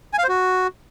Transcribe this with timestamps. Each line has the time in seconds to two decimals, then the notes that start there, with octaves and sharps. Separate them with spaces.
0.13 G#5
0.19 F5
0.24 C5
0.29 F#4